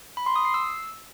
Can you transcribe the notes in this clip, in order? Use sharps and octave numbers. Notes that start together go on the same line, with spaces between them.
B5
C6
D#6
C7
E6